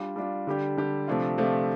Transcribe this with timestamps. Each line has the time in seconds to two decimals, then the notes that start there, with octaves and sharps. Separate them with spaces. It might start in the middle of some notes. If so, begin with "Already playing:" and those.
Already playing: G3 D4 F4
0.16 G3 D4 F4
0.47 D3 G3 D4 G4
0.77 D3 G3 D4 G4
1.08 C3 F3 A3 D4 F4
1.38 C3 F3 A3 D4 F4